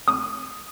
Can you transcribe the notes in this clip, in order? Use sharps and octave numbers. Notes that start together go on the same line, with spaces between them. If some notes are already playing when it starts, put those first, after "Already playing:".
D#6